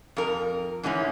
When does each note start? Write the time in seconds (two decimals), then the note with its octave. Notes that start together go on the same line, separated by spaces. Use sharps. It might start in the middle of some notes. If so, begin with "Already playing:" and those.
0.17 F2 A#4
0.83 G#2 E3 G#3 C#4 E4